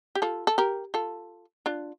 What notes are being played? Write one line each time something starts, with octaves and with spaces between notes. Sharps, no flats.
G4
F4 A4
A4
G4 A#4
F4 A4
D4 F4